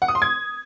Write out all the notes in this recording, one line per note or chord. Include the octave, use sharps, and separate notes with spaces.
F#5
D#6
C6
G#6